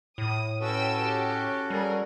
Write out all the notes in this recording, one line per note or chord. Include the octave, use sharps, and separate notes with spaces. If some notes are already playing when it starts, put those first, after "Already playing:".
A2 D#6
C#4 F#4 A4 B4 G5 E6
G4
G3 G#4 A#4